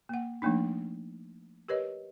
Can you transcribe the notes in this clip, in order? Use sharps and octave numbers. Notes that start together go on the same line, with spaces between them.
A#3 F#5
F3 A3 A#3 D4 D#4
G4 A#4 B4 C#5 D#5